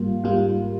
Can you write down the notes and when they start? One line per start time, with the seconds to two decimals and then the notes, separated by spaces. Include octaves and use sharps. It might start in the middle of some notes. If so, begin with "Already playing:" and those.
Already playing: G#2 G3 A#3 F4
0.24 G#2 G3 A#3 F4